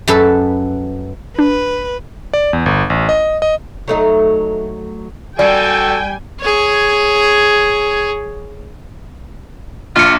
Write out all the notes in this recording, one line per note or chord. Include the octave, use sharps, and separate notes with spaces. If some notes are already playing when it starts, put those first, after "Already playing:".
F#2 A4 B4
D4 B4
D5
E2
G1
A1
D#5
D#5
F#3 A3 D#4
G3 F#4 A4 D5 G5 G#5
G#4 C#5
A#1 F4 C#7